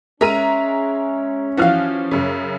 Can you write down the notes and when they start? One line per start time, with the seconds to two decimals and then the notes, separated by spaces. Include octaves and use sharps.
0.21 G#3 C#4 A#4 E5 A#5 D#7
1.57 E3 F3 F#4 F5 F6
2.11 F#2 C#3